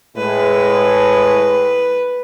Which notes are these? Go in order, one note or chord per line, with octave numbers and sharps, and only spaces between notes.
A2 G#3 B4